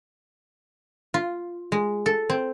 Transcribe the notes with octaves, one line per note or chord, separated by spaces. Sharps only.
F4
G#3
A4
C4